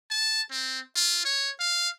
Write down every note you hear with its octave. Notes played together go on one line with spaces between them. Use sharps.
A5
C4
F4
C#5
F5